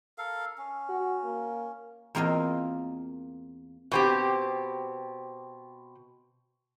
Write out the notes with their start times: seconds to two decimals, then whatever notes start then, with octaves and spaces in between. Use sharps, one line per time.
0.18 A4 A#4 F5
0.58 C#4
0.89 F#4
1.24 A#3
2.15 E2 A#3 C4 F4 D#5
3.92 B2 C4 G4